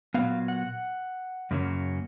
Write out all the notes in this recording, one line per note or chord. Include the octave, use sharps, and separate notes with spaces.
A#2 F#3 B3 F5
F#5
F#2 C#3 F#3 A#3 C#4